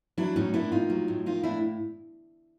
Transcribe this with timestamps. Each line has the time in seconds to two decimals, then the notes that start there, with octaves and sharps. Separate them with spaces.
0.18 F#3 D4 E4
0.36 A2 C#4 D#4
0.54 A#3 D4 E4
0.72 A2 D#4 F4
0.90 F#3
1.08 A2
1.26 A#3 D#4 F4
1.43 A2 D4 E4